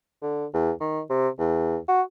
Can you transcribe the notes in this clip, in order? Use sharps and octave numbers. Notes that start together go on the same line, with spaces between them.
D3
E2
D#3
C3
E2
F#4